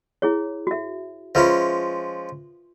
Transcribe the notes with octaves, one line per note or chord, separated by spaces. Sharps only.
E4 G#4 C#5
F#4 E5
F3 G#3 C#4 F4 B4 E5